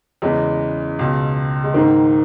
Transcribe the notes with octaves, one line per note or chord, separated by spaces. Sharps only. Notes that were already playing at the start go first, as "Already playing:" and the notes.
E2 C#3 E3 G#3
C#2 B2
G#3
G#2 D#3 A#3